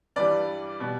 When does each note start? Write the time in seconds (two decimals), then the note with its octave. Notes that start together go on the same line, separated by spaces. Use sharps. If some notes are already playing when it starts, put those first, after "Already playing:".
0.16 G2 E3 G3 B4 D5
0.80 B2 G3